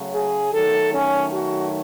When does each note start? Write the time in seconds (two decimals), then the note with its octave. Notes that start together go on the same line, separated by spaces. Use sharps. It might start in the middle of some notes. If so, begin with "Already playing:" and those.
Already playing: C#3 F#3 A3
0.14 G#4
0.53 D#3 F#3 A3 A4
0.94 C#4
1.34 F#4